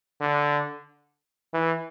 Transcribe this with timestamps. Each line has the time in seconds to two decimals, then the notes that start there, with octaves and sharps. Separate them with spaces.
0.21 D3
1.53 E3